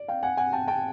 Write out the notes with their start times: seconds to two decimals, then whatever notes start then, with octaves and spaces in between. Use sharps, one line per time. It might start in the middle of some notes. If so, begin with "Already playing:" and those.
Already playing: D5
0.08 F5 G5
0.23 F#5 G#5
0.37 F#5 G#5
0.53 G5 A5
0.68 G5 A5